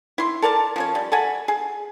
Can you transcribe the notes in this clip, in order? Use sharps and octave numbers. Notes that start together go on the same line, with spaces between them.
E4 C6
A4 A#4 D5 A5
F3 C#4 C#5
G3
A4 F#5 G#5 B5
G#4